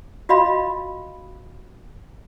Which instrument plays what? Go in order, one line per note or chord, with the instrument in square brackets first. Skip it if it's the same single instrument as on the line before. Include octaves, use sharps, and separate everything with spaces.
[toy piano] F4 F#4 D#5 F5 B5